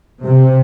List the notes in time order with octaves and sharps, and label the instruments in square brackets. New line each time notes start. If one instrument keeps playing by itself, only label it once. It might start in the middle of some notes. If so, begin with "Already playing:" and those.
[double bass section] C3